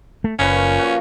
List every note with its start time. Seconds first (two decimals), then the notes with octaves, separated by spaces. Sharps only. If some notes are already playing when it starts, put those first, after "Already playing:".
0.24 A3
0.39 F#1 A#2 F3 C#4 B4
0.56 G#5 C#6
0.79 F3 F#4